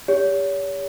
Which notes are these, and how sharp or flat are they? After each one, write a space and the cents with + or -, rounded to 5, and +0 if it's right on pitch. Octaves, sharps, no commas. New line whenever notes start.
G4 +30 C#5 +35